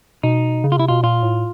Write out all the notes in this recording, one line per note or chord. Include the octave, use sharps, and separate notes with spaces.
B2 D#4
C#3
F4
C3 E4
B2 F4
A#2 F4
A2